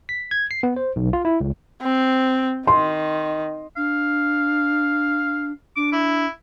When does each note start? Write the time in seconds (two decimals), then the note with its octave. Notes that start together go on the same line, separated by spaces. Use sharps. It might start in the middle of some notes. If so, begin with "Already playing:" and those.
0.09 B6
0.31 G#6
0.51 C7
0.63 B3
0.76 C5
0.96 B1
1.13 F4
1.25 E4
1.41 C#2
1.82 C4
2.67 D#3 C6
3.77 D4 F5
5.76 D4 D6
5.93 E4